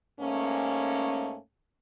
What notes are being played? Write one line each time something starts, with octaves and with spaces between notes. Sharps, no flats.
G#2 A3 A#3 C#4